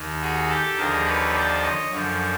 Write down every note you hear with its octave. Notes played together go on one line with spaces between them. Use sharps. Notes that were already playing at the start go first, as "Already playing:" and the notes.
Already playing: D#2 D#3
F#4 G#4
G4 A4
D#2 D3 F3 G#4 A#4
B4 C#5
C5 D5
C#5 D#5
F#2 D3 F3